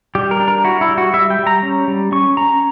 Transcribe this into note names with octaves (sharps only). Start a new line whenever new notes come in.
G3 G4
A#4
D4
A#4
E4 F#4
E4
G3
F#4
G3 E5
G5
G3
A#5
C#4
G3
C#4 C#6
C#4 A#5